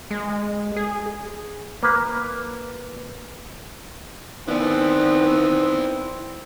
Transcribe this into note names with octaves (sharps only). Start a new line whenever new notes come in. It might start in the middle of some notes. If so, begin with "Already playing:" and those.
G#3
G#4
A#3 B4
D#3 B3 C4 E4 D5